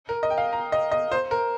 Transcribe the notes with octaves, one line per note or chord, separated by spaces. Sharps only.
A#4
D#5
G5
F5
A#5
D#5
D#5
C5
A#4